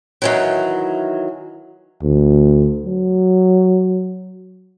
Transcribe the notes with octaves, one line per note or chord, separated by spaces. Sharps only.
D#3 E3 F#3
D2
F#3